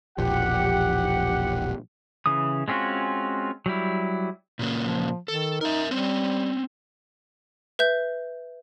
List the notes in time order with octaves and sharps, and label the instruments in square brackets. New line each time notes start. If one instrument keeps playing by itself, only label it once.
[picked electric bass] E1 A#1 F3 [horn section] G4 F#5
[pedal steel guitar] C#3 E3 D#6
G#3 C4 C#4 F4 F#4
F#3 G3 E4
[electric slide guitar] A#2 C#3 A#3
[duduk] F3
[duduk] D#3 [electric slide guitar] A4
[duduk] D#4 [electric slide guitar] A#4 E5
[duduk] G3 [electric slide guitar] C4 C#4
[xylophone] B4 E5 G6